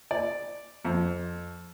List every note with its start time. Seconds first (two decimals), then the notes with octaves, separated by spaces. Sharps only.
0.11 D5
0.85 F2